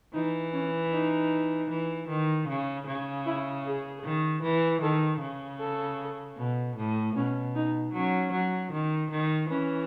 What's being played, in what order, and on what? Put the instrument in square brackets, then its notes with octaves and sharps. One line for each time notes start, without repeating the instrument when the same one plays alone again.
[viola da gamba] E3 [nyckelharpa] D#4
[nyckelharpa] C#4
D#4
[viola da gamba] E3
D#3
C#3
C#3
[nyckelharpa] E4
G#4
[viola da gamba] D#3
E3
[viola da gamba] D#3 [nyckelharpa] A4
[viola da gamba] C#3
[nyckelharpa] A4
[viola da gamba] B2
A2
[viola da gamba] B2 [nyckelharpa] C#4
[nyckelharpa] D#4
[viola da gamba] F#3 [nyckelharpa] C#4
[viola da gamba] F#3
D#3
D#3
[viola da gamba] E3 [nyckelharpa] C#4